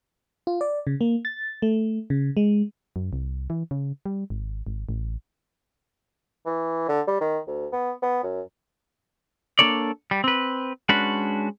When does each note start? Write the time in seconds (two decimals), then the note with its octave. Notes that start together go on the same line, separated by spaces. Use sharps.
0.47 F4
0.61 D5
0.87 C#3
1.01 A#3
1.25 A6
1.62 A3
2.10 C#3
2.37 G#3
2.96 F#2
3.13 C2
3.50 E3
3.71 C#3
4.06 G3
4.30 G#1
4.67 G#1
4.89 A1
6.46 E3
6.89 D3
7.07 G3
7.21 D#3
7.47 D2
7.72 B3
8.02 B3
8.23 F#2
9.59 A#3 D4 A4 C#5 D5
10.11 G3
10.24 C4 B4
10.89 G#3 C#4 D4 F#4 B4